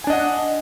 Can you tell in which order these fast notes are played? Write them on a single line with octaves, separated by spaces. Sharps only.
G#5 D4 D#5 F#5